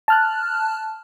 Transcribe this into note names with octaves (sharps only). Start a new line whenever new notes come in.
A5 F6 F#6